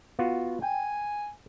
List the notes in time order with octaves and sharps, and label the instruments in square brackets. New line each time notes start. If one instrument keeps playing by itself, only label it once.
[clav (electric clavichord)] B3 F4 F#4
[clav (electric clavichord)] G5 [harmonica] G#5